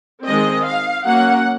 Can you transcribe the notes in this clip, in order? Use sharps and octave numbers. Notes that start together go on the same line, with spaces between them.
D#3 G#3 C4 D#5
F5
F#3 A#3 C#4 F#5